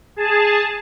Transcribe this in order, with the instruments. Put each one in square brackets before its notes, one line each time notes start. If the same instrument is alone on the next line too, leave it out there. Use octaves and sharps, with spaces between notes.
[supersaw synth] G#4 A5